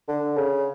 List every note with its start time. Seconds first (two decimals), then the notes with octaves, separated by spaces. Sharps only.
0.08 D3
0.37 C#3